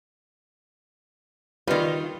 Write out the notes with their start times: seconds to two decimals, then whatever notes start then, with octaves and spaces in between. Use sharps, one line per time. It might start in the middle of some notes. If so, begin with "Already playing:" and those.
1.67 D#3 G3 F4 B4